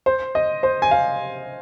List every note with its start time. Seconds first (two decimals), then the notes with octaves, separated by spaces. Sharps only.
0.06 C5
0.35 D#5
0.63 C5
0.82 G#5
0.91 F5